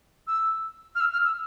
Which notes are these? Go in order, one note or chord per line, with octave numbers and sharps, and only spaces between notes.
E6
F6
E6
F6
E6